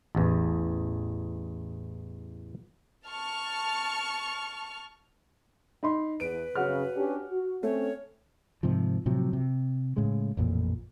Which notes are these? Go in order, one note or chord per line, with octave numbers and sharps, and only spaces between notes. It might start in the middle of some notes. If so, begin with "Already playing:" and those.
A1 E2
A5 C#6 F6
D#4 B5 C6
E2 B4 D7
F#2 C#3 F#4 F#5 F6
C#4 D4 G4
F#4
A3 C4 C#4 C#5
G#2 C3 D#3 F3
A2 C3 F3 F#3
C3
A2 C#3 G#3
A1 F2 A#2